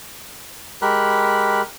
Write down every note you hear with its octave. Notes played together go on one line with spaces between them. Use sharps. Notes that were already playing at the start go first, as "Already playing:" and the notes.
G#3 G4 A#4 B5 F#6